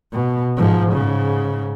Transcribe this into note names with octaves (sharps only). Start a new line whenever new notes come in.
B2
G#2 F3
G#2 C#3